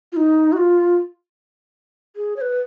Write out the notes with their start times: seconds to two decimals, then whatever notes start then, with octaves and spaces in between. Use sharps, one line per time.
0.12 F4
0.17 D#4
0.53 F#4
0.57 F4
2.16 G#4
2.36 C#5
2.41 B4